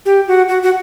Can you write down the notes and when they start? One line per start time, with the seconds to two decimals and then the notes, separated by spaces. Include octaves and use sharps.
0.06 G4
0.27 F#4
0.49 F#4
0.63 F#4